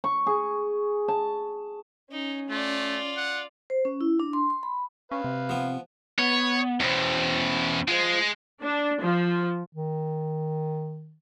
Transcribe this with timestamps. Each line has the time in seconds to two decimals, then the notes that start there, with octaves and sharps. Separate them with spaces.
0.04 C#6
0.27 G#4
1.08 A5
2.12 C#4 D#4
2.50 A3 F4 D5
3.17 F#5
3.70 C5
3.85 C#4
4.01 E4
4.20 D4
4.33 C6
4.50 C6
4.63 B5
5.11 C#4 B4 F5
5.24 C3
5.49 F3 B3
6.19 B3 C#5
6.80 E2 B2 C#4 C5
7.88 G#3 F4 C5
8.63 D4
9.02 F3
9.74 D#3